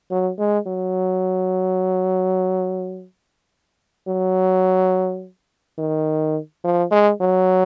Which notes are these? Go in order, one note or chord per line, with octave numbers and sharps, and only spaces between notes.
F#3
G#3
F#3
F#3
D#3
F3
G#3
F#3